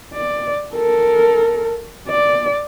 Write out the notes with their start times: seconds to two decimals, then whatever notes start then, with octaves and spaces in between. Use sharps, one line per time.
0.13 D5
0.75 A4 A#4
2.08 D5